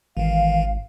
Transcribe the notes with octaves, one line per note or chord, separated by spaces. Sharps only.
G#1 D#3 E3 F5